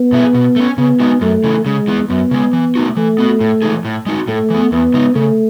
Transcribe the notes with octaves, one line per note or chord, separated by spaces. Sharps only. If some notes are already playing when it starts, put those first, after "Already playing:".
Already playing: B3
B2 A3 E4 G#4
B2
A3 C#4
C#3 B3
G#3 D#4 F#4
F#2 A3
C#3 E3
C#3 G#3
E3 B3
F#2 B3
C#3 G#3
E3
A3 D#4 F#4
E3 A3
B3 F#4
A2
E3 G#3 D#4 G#4
A2
G#3 D#4 F#4
A2 A3
E3 B3
E2 B3
C#3 G#3 D#4
C#3 A3